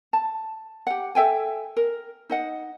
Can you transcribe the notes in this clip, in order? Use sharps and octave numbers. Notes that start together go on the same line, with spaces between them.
A5
G4 F#5
A4 E5 G5 G#5
A#4
D#4 D#5 F#5